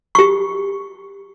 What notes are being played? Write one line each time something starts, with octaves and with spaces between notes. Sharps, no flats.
G4 C#6